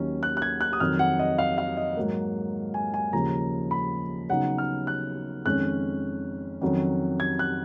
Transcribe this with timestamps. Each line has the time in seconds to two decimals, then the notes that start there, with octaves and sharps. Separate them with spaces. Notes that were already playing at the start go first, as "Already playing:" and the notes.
Already playing: D#2 D#3 F#3 C#4
0.23 F#6
0.37 F#6
0.42 G#6
0.61 F#6
0.73 D#6
0.80 F2 D#3 F#3 F6
0.99 F#5
1.19 D#5
1.39 F5
1.58 F5
1.77 D#5
1.97 G#2 F#3 A#3
2.74 G#5
2.94 G#5
3.13 D#2 C#3 F3 A#5
3.71 B5
4.29 C#3 F#3 B3 D#4 F#5
4.58 F6
4.87 F#6
5.45 F2 D#3 G#3 C#4 F#6
6.61 F2 D#3 F#3 C#4
7.20 G#6
7.39 F#6